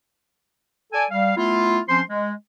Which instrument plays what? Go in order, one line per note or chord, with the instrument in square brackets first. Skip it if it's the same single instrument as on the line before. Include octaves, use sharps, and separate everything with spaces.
[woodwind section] A4 D5 G#5
G3 F5
A3 B3 E4 F4
F3 C4 C#4 C5 C6
G#3